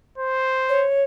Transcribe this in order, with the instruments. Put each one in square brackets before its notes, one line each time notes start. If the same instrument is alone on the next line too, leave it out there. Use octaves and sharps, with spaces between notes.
[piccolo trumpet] C5
[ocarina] C#5